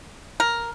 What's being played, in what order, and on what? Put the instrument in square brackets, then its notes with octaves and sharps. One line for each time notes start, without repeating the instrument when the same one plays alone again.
[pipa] A#4